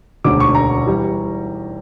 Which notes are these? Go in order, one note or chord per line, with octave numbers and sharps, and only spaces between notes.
E1 D2 D3 D6
C#6
A#5
E3 G3